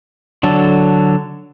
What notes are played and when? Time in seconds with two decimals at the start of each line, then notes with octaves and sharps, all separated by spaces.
0.43 D3 F#3 D4 A4